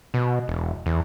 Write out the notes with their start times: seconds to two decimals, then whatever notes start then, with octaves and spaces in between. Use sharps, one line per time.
0.14 B2
0.48 E1
0.86 E2